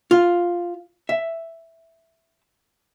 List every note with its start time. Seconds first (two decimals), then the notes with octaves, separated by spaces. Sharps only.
0.11 F4
1.09 E5